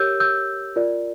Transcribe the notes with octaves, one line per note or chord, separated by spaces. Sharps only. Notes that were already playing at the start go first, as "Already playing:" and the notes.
Already playing: G4 A#4 C#5 E6 G6
E6 G6
F4 A#4 D5